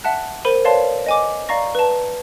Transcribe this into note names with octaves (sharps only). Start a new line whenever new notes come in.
E5 F#5 A5 F#6
A#4 C5 B5 D#7
B4 C#5 D5 F5 A5 C6
D#5 G#5 D6
D5 F5 A#5 C#6 A#6
B4 A5